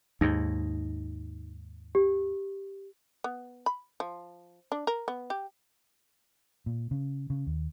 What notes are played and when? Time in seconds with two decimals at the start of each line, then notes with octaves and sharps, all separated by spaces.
0.21 D#2 G#2 D#4 A#6
1.95 G4
3.24 B3
3.66 B5
4.00 F3
4.72 D4
4.87 A#4
5.08 B3
5.30 G4
6.66 A#2
6.91 C#3
7.30 C#3
7.46 D#2